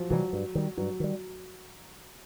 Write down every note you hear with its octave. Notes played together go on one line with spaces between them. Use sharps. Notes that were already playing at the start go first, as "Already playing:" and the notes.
Already playing: F3 F#3
C3 E3 F#3 G3
G2
D#3 G3
G2 F#3
D#3 G3